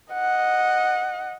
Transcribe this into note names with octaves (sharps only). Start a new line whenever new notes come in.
D#5 F#5